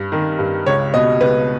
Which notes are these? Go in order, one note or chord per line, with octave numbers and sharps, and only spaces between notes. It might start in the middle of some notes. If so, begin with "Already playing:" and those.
Already playing: G2
D#3
G2
C#2 C#5
B2 D#5
C#2 B4